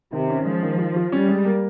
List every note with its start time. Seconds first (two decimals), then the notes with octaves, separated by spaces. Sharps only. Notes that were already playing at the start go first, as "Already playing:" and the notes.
0.12 C3 D#3
0.30 C#4
0.45 F3 G#3
0.63 D#3
0.78 F4
0.96 F4
1.12 G3 C#4
1.28 G#3
1.45 A#3